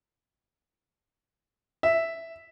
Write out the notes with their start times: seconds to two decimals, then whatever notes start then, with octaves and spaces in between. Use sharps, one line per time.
1.83 E5